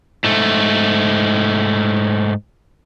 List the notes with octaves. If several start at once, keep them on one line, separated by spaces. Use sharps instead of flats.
G#2 A3